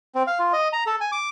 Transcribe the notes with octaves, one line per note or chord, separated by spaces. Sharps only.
C4
F5
F4
D#5
A#5
A4
G#5
D6